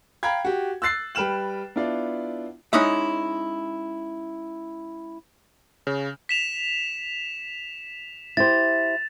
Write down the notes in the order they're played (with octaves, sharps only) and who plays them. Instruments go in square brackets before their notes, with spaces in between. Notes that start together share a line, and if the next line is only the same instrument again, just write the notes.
[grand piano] F5 G5 A#5 B5 G#6
F#4 G4
E6 F#6 A6 C7
G3 B4 G5 F6 E7 F#7
B3 D4 E4 F4 D5
[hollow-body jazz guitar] G#3 C#4 D#4 E4 E5
[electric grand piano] C#3
[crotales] B6 E7 F7
[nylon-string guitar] E4 G4 C5 [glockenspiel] A6